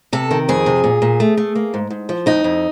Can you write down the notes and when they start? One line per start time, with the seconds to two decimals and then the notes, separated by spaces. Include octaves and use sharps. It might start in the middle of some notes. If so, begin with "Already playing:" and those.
0.13 C3 A4
0.31 D#3
0.49 F2 G#4
0.66 C3
0.84 A#2
1.02 A#2
1.20 A3
1.37 A3
1.55 A#3
1.74 G#2
1.90 G#2
2.09 F3
2.26 F2 D#4
2.44 F2